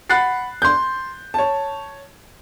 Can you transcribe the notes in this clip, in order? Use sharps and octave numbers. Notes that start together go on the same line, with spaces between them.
F#5 B5 F#6 A6 C7
C6 G6
C#5 A5